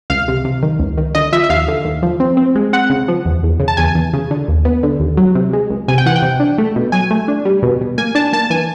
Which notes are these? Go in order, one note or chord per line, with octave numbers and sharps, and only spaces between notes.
C#2 F5
C3
C3
D#3
C#2
D#3
D3 D#5
F3 E5
E5
D#2 F5
D3
D#2
F3
C4
C4
G#3
C4 F#5
C#3
F3
E2
E2
C#3
A5
E2 G#5
E2
C#3
D3
D#2
B3
D3
D#2
F#3
C3
G#3
C#2
C3 G#5
G5
E3 F#5
G5
C3
D4
A3
B2
F#3 G#5
A3
D4
G3
B2
B2
A#3 G#5
D4 A5
A#3 A5
E3 G#5